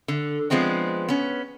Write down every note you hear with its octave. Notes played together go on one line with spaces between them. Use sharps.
D3
F3 G#3 B3 C4 D4
B3 C#4